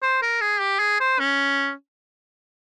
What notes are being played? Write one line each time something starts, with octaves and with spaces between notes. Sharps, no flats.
C5
A#4
G#4
G4
G#4
C5
C#4